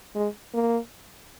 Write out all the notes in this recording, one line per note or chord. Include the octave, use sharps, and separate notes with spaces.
G#3
A#3